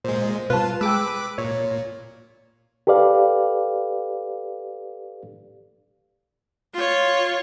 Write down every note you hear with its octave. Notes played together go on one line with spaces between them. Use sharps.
A#2 G#3 C5
B2 G3 F4 B4 A5
G#3 G#4 B4 G5 D6 E6
A#2 C#5
G4 A4 B4 D5 F5
F4 C#5